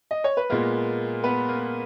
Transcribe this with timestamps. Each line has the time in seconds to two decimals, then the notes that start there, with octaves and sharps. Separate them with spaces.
0.11 D#5
0.24 C#5
0.37 B4
0.50 A#2 G#3 A#3 B3 A#4
1.24 B3 B4
1.49 A#3 A#4